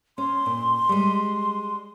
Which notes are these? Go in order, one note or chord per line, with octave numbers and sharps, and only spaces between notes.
C#4 C6
A#2
G3 G#3